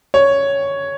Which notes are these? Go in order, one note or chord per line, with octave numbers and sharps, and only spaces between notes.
C#5